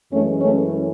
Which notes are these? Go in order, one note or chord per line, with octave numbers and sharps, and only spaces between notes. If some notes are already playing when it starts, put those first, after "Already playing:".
F#2 E3 G#3 A3 C#4
A3 C#4